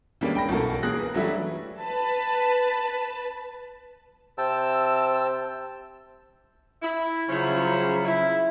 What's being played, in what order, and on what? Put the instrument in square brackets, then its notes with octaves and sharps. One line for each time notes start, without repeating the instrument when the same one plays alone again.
[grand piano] E3 G3 G#3 A#3 C#4 D4
G5 B5 A#6
B1 E3 F#4 A4 A#4
A#3 G#4 F#6 A#6
B4
E3 F#3 G3 A3 D4 E4
[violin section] B4 A5
[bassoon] C3 [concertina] G5 A5 [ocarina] E6
[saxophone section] E4
[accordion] C#3 F#3 [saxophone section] F3 C#4 E4
[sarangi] E4